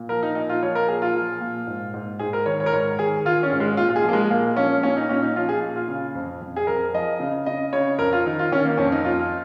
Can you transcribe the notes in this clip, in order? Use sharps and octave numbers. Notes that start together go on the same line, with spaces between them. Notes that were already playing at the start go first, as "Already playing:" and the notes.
Already playing: A#2
F3 A#4
D#4
A#2 D#4
F4
F3 C#5
A#4
A#2 G#4
F4
F3
A#2
G#2
G#2
G#2 G#4
A#4
D#3 C#5
C#5
A#4
G#2 C#5
D#3 G#4
D#3 F4
C#4
G#2
G#3
A#2 F4
F4
G#4
F3 A#3
G#3
A#2 A#3
F3 C#4
A#2 C#4
D#4
A#2 C#4
D#4
F3 F4
G#4
A#2
F4
C#3
F2
F2
G#4
F2 A#4
F3 D#5
C#3
C#3 D#5
C#3 C#5
F2 A#4
F4
D#3 D#4
F4
D#3 C#4
A#3
F2 C#4
D#4
F2 F4